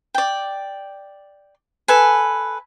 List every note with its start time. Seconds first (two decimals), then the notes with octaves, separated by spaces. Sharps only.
0.14 D5 G5
1.88 A4 B4 G#5